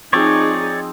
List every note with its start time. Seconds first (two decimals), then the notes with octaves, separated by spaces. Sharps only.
0.13 F3 C4 D#4 G#4 C#5 D5